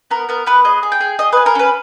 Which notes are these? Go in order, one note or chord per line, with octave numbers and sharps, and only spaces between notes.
B3 A#4
B3 A#4
B3 B4
G#4 D#5
G#4
G5
G#4
G#4 D#5
G#4 B4
A#4
C#4 B4